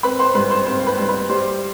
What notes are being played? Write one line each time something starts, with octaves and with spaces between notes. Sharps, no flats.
C4 B4 B5
C5 C6
G2 B4 B5
C5 C6
C4 C5 C6
B4 B5
G2
B4 B5
G3 C5 C6